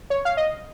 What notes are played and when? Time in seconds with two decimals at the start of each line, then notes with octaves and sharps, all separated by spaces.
0.10 C#5
0.25 F5
0.37 D#5